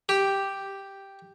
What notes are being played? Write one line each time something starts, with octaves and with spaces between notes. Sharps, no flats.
G4